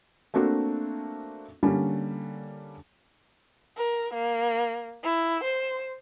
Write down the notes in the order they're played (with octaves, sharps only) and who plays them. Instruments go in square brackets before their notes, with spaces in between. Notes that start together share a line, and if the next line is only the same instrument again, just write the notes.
[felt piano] A3 A#3 C4 D4 F#4
D3 G3 A#3 C#4
[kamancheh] A#4
A#3
E4
C5